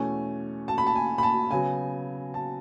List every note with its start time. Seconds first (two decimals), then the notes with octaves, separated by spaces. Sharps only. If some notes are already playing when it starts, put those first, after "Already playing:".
Already playing: E2 B2 A3 C#4 G#5
0.68 A5
0.78 B5
0.87 A5
0.95 G#5
1.18 B5
1.23 A5
1.51 C#3 F#3 B3 G#5
2.34 A5